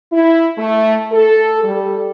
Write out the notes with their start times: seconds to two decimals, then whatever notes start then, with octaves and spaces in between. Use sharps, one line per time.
0.12 E4
0.58 A3
1.12 A4
1.63 G3